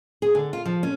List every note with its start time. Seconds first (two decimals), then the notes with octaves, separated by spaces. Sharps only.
0.22 G#4
0.35 D3
0.53 F4
0.66 F3
0.83 C#4